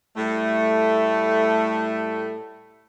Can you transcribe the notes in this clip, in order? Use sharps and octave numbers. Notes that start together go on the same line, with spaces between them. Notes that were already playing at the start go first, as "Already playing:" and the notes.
A2 G3 A3